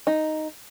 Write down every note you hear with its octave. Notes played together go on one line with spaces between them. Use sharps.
D#4